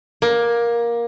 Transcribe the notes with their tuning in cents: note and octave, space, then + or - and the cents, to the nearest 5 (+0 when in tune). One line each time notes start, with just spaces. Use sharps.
A#3 +15